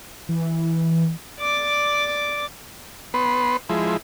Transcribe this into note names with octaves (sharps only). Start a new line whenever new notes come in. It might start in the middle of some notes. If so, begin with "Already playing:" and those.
E3
D5 D6
B3 B4 C6
F3 G#3 E4